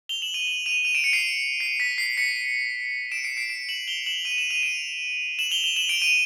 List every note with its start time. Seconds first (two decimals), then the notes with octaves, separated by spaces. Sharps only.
0.09 F7 G7
0.22 E7 F#7
0.34 D#7 F7
0.47 E7 F#7
0.66 D#7 F7
0.85 D#7 F7
0.94 D7 E7
1.04 C#7 D#7
1.13 C7 D7
1.60 C7
1.80 B6
1.98 C7
2.17 B6 C#7
3.12 D7 E7
3.24 C7 D7
3.37 C7 D7
3.50 D7 E7
3.69 E7 F#7
3.88 F7 G7
4.06 E7 F#7
4.25 D#7 F7
4.38 E7 F#7
4.50 D#7 F7
4.63 D7 E7
5.39 E7 F#7
5.51 F7 G7
5.64 F7 G7
5.76 E7 F#7
5.89 D7 E7
6.02 D#7 F7